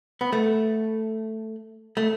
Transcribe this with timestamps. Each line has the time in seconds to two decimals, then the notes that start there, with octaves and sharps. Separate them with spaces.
0.21 B3
0.33 A3
1.97 A3